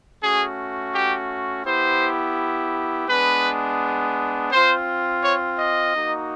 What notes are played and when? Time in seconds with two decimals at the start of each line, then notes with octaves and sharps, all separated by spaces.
0.22 A3 C#4 F#4 G#4
0.94 G4
1.66 B3 E4 G4 C5
3.08 G#3 B3 D4 B4
4.52 C4 F4 C5
5.23 C#5
5.59 D#5
5.95 A#3 D#4 F#4